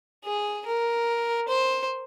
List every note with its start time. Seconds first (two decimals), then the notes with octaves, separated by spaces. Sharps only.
0.24 G#4
0.66 A#4
1.48 C5